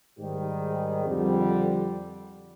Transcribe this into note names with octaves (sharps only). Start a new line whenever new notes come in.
G#2 D#3 G3 G4
G#4
F2 D3 G3